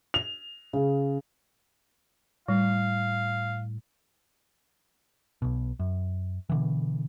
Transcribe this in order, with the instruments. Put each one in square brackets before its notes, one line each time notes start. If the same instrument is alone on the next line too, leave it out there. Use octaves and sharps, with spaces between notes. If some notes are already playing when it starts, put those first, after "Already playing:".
[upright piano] F7
C#3
[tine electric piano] A2 [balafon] G3 [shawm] F5
[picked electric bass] B1 B2
F#2
B2 D3 E3